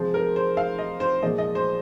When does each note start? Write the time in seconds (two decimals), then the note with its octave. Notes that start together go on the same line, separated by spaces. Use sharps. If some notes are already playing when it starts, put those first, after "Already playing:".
Already playing: C3 F3 G#3 C5
0.14 A#4
0.36 C5
0.57 F5
0.78 D#5
1.00 C5
1.22 A#2 F3 G#3 D#5
1.38 D#5
1.55 C5